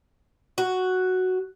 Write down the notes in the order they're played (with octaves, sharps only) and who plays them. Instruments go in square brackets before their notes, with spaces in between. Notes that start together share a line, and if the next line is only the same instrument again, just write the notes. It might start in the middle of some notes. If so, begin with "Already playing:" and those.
[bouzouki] F#4